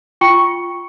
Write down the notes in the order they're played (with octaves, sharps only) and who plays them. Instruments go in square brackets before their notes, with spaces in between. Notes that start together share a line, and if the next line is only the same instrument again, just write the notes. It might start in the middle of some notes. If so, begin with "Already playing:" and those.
[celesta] F4 G5 C#6 C#7